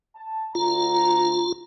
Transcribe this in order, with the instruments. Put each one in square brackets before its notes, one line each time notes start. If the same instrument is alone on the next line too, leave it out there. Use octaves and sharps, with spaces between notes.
[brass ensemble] A5
[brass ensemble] D2 A#5 [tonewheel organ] F4